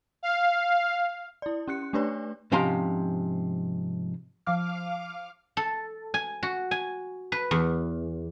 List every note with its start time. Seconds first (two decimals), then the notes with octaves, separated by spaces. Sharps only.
0.23 F5
1.42 E4 D5
1.68 C#4 G4 F#6 C#7
1.93 A3 D4 G4 B4 C#5 D5
2.52 G#2 C3 F3 C#4 A#5 C6
4.47 F3 F5 D6 F6
5.57 A4
6.14 G#5
6.43 F#4
6.71 G#5
7.32 B4
7.51 E2